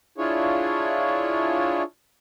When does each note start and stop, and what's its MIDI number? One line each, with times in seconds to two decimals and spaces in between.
0.18 1.83 62
0.18 1.83 64
0.18 1.83 65
0.18 1.83 68
0.18 1.83 73